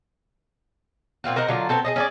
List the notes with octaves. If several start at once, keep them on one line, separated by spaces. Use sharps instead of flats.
A#2 C4 F4 F#4
A#4 C5 D#5 F#5
D3 F#3 F4 D5
B3 C4 A4 C5
G#4 C5 D#5
C#4 G#4 D5